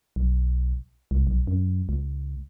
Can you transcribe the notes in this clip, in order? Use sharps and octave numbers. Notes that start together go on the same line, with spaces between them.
B1
C2
B1
F#2
C#2